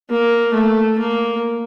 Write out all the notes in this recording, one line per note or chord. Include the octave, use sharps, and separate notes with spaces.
A#3
A3
A#3